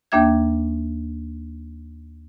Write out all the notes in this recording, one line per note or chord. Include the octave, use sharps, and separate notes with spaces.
D#2 A#3 D4 E5 G#6